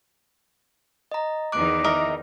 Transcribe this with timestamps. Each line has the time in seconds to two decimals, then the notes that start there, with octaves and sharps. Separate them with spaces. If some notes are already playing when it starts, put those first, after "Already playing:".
1.12 D#5 A#5
1.52 E2 D#3 D#4 D6 F#6 D7
1.84 A#4 D#5 E5